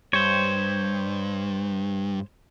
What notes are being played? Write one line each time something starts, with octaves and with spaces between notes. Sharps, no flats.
G2 C5 C#5